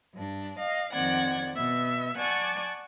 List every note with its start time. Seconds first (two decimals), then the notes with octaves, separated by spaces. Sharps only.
0.14 G2 D4
0.58 D#5 F5
0.92 F2 D#3 C4 D5 F#5 G#6
1.55 B2 B3 E5
2.17 D5 F#5 G#5 A5 C#6 D6